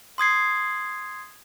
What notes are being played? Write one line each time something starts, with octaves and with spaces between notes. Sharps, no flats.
C6 D#6 G#6 C7